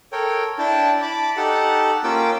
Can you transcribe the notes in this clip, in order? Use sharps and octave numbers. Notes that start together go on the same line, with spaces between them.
A4 A#4 C#5 G5
D4 E4 G5 A5
A5 B5 D6
D#4 G4 A4 F#5 A5
A#3 C#4 F4 G5 D6 E6